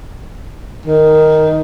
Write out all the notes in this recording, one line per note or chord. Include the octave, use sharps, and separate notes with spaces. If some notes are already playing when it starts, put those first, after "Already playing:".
D#3